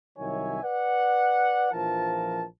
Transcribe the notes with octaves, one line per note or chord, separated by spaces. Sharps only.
C2 D#3 F#3 C#5 E5 G#5
B4 D5 F#5
A#1 E3 F3 A#4 A5